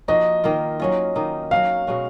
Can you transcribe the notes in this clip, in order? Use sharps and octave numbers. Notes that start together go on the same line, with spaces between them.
F3 A#3 D#4 F#4 D#5
D#3 A#3 F4
F#3 C#4 F4
D#3 A#3 D#4
F#3 C#4 F#4 F5
B2 G#3 C#4 F#4